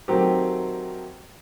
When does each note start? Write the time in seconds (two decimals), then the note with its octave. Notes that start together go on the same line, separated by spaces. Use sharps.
0.08 D#3 F#3 A3 C4 G4